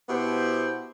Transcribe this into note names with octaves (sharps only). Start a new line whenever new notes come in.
B2 B3 E4 G4 C5